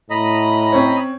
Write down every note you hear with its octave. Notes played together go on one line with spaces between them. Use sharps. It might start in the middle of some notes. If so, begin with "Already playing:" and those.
A2 D#5 A#5 B5
C4 C#4 C#5